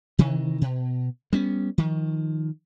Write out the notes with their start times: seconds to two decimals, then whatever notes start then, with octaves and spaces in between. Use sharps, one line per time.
0.19 C3 D#3 E3
0.61 B2
1.33 G3 B3 C#4
1.78 D#3 F3